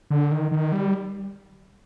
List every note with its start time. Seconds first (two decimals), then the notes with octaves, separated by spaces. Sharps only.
0.10 D3
0.31 D#3
0.52 D#3
0.72 G3